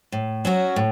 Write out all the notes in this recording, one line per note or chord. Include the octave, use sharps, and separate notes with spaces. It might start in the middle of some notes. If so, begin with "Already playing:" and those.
A2
F#3 C#4 F#4
A2